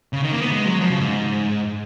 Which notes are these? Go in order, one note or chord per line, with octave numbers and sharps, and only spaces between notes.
C#3
D#3
A#3
B3
G#3
F#3
F3
C#3
G#2